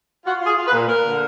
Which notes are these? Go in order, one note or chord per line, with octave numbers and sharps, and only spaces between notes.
F4 F#4
F4 G#4
F4
B4
A#2
A#3 A#4
D3